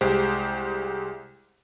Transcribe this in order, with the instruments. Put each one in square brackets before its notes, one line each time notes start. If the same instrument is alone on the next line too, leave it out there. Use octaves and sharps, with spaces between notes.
[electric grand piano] C2 G#3 G4 C5